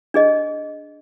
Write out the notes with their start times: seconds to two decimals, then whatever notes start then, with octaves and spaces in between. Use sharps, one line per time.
0.14 D4 G#4 D#5